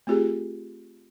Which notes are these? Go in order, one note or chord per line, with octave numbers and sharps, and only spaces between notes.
A3 C4 F4 G4 G#4